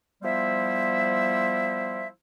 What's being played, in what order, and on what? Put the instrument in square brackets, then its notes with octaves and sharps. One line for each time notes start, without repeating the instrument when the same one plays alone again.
[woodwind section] F3 G3 B3 E4 C5 E5